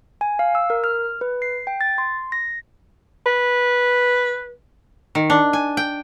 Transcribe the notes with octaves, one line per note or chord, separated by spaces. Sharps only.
G#5
F5
E6
A#4
F6
B4
C7
G5
A6
C6
A#6
B4
D#3
D4
G#5
G5